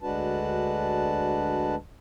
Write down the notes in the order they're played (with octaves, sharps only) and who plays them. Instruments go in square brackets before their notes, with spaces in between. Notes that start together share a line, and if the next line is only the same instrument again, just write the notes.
[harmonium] D2 G#3 D4 F#4 B4 A5